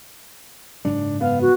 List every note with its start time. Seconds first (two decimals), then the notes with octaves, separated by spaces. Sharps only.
0.85 F#1 G#2 F#3 D4
1.21 B3 F5
1.42 F#4